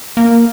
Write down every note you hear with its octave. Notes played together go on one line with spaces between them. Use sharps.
A#3